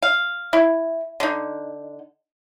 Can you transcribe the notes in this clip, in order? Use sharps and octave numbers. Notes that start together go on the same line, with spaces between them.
F5
E4
D3 D#4